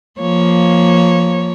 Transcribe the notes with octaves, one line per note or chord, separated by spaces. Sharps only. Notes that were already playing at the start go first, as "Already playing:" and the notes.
F3 A#3 C#5